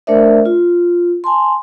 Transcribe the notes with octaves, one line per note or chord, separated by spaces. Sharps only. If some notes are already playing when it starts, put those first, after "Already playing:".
A3 D4 A#4 C5 D5 E5
F4
G#5 A5 C6